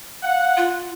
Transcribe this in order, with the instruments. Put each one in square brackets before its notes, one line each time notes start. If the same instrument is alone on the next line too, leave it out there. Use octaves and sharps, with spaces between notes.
[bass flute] F5 [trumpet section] F#5
[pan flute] F4